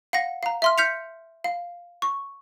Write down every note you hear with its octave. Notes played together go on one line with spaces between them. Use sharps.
F5 F#5 A#6
F5 A#5
E5 C6 F6
F6 G6 B6 C#7 F7
F5
C#6